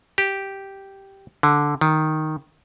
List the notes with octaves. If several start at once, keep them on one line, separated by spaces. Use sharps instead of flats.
G4
D3
D#3